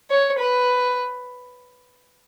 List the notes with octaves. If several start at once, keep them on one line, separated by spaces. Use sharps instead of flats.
C#5
B4